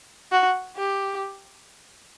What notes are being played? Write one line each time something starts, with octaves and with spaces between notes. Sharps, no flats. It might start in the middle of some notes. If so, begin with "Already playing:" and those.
F#4
G4